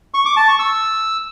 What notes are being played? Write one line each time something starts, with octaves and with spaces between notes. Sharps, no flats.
C#6
D6
A5
C#6
E6